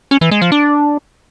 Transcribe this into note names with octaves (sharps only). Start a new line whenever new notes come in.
C#4
E3
G#3
F3
D4